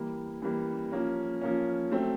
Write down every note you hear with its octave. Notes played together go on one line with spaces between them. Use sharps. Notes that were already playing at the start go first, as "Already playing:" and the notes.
Already playing: E3 G3 A#3
E3 G3 A#3
F3 A#3 C#4
F3 A#3 C#4
F#3 A3 C4